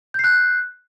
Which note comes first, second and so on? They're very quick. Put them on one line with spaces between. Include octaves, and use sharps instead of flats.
G6 C7 F#6